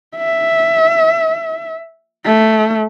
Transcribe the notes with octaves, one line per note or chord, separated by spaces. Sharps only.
E5
A3